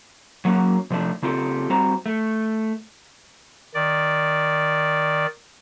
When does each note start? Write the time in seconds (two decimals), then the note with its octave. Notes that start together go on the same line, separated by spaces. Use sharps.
0.45 F#3 A3 A#3 C#4 F#4
0.90 C3 F3 A3 D4
1.22 C#3 C4 F4 G4 A4
1.70 G3 C4 F#4 C5 A#5
2.06 A3
3.74 D#3 D5